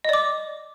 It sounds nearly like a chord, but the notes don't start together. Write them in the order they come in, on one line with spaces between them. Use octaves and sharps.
D#5 D5 D6